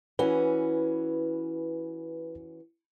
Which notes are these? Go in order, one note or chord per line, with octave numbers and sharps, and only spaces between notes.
E3 C#4 F#4 B4